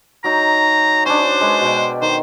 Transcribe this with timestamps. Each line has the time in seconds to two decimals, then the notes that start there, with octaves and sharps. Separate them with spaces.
0.24 F#3 D#4 A#5
1.06 C#4 D4 C5
1.41 G#3 B4 C6
1.61 B2 G5
2.02 D#3 C5